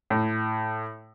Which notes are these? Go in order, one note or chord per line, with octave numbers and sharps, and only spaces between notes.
A2